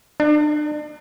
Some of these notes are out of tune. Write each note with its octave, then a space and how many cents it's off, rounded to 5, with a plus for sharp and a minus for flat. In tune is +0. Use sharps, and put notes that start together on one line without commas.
D4 +35